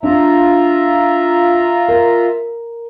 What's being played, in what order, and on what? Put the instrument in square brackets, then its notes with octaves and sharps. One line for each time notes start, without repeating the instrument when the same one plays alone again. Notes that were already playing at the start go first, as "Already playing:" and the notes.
[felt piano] D4 [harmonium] F4 E5 A#5
[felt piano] A#4